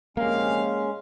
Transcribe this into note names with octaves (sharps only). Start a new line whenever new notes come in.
A#1 C3 G#3 A#3 C#4 F5